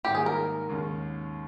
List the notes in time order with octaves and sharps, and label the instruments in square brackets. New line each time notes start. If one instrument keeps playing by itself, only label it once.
[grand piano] G#2 D#3 G3 A#3 D#4 [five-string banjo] G4
[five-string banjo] G#4
A#4
[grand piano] D#2 C#3 G#3 C#4